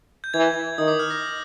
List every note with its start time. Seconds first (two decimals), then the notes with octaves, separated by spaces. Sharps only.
0.24 G6
0.34 E3 G#6
0.78 D#3 D#6
0.88 D6
0.99 F6
1.10 A#6